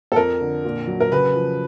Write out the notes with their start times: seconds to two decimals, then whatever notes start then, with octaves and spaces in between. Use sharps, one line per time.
0.12 A4
0.16 F2 A#4
0.41 D3
0.64 A#2
0.87 F#3
1.00 A#4
1.12 C#3 B4
1.35 F3